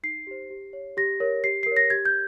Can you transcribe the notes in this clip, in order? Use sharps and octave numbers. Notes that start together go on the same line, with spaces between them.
D#4 C7
G4 C5
G4
C#5
G4 A#6
A#4 C#5
G4 C7
A#4 C7
C#5 A#6
G4 G#6
G6